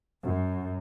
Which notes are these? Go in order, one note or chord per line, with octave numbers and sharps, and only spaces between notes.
F#2